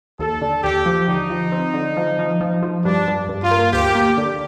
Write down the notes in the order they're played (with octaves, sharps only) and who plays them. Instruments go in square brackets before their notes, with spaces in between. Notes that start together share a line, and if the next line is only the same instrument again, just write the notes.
[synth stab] D#2 [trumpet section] A4
[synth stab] D3
[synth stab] D#2 [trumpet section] G4
[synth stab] F3
[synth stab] D3 [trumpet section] D#4
[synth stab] F3
C4
D3
F3
F3
F3
F3
[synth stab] G2 [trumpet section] D4
[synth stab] G2
G2
[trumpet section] F4
[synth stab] A#3
[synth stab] D2 [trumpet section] G4
[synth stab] A#3
D3